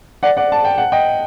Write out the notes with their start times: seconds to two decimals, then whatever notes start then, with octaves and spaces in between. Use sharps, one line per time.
0.23 D5 F#5
0.37 D5 F#5
0.52 A5
0.65 G5
0.78 F#5
0.92 D#5 G5